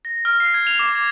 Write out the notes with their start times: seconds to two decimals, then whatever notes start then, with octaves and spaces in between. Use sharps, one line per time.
0.05 A#6
0.25 F6
0.40 C7
0.54 G#6
0.67 F7
0.79 D6
0.95 G#6